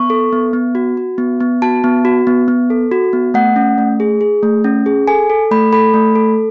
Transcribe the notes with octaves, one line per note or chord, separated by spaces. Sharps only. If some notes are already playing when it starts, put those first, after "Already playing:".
Already playing: B3 C#6
A4
B3
B3
F#4
F#4
B3
B3
F#4 A5
B3
F#4
B3
B3
A4
F#4
B3
A3 F#5
C#4
A3
G#4
G#4
A3
C#4
G#4
A4 G#5
A4
A3 B5
A4 B5
A3
A4